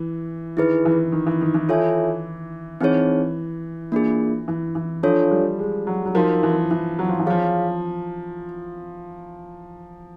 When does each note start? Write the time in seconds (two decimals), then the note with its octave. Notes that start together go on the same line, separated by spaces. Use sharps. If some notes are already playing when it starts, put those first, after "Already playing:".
Already playing: E3
0.57 D#3 E4 G#4 B4
0.85 E3
1.12 D#3
1.27 E3
1.41 D#3
1.54 E3
1.69 F4 A4 C#5 E5 G#5
2.81 E3 C4 D#4 G#4 C#5
3.92 A#3 D4 F4 G#4
4.48 E3
4.75 E3
5.03 F3 D4 F4 A4 C#5
5.31 G3
5.59 G#3
5.87 F#3
6.06 F#3
6.15 F3 D#4 F#4 A#4
6.43 E3
6.71 E3
6.99 F#3
7.08 F3
7.19 E3
7.27 F3 G#4 C#5 F5